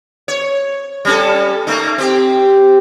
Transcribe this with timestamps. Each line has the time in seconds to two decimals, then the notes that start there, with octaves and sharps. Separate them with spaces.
0.28 C#5
1.05 G3 C#4 A4
1.67 A3 A#3 D#4
1.98 C4 G4